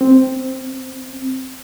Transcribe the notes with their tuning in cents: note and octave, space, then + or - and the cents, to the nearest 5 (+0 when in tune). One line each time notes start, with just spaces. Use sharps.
C4 +0